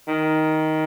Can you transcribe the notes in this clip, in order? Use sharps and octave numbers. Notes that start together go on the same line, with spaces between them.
D#3